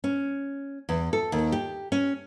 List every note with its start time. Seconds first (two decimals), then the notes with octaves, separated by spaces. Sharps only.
0.04 C#4
0.89 E2
1.13 A4
1.32 D#2
1.52 G4
1.92 C#4